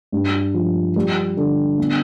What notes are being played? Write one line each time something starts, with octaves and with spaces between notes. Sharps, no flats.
G2
F3
G3
D3
B3